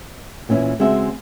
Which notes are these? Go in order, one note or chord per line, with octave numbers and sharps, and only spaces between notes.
A#2 E3 C#4 E4
C#3 G#3 C4 F#4 E5